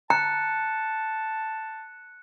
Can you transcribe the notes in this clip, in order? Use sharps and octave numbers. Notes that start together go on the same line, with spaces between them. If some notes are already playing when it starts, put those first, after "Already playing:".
A5 A#5 F#6 C#7